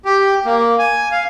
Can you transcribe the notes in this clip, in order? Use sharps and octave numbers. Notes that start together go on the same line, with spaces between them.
G4
A#3
G#5
F5